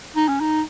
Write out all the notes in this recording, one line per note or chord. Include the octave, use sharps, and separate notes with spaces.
D#4
C#4
D#4